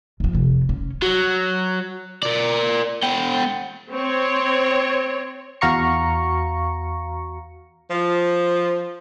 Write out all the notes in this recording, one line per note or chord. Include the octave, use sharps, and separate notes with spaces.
F2 F3
F2 C3
C#4
F#3
A#4 D5
B3 G5
C4 C#5
E2 F#4 F5 A#5 C#6 C#7
F3